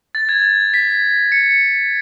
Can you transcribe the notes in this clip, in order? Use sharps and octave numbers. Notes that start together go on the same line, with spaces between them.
A6
G#6
A6
B6
C#7